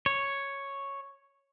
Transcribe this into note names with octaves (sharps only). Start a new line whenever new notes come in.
C#5